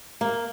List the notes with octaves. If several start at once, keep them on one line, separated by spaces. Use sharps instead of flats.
A#3